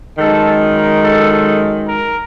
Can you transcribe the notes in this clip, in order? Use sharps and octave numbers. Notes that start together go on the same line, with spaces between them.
F#2 D#3 G#3 A4
A#4
A4
A4
A#4